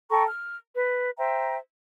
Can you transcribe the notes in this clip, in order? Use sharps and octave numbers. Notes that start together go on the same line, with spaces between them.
A4 G5 A#5 C#6
F6
B4
C5 E5 G5 A#5